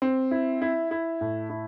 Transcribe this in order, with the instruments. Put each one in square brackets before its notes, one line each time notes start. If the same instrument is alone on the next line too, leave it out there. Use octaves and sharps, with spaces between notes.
[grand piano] C4
E4
E4
E4
A2
E4